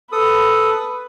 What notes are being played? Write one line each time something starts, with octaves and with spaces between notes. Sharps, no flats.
A4 B4 D#6